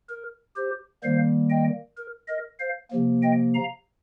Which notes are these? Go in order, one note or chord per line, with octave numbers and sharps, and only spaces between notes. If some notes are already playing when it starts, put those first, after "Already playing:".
A#4
G4 C5
D#3 G3 A#3 C5 F5
D#5 G5
A#4
A#4 D#5
C5 F5
C3 F3 A#3
D#5 G5
F5 A#5